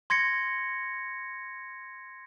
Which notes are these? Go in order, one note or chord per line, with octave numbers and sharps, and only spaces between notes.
C6 G#6 A#6 C#7